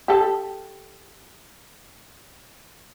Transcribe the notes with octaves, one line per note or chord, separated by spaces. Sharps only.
G4 A4